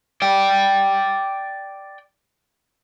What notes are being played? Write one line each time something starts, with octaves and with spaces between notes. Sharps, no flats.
D5 G5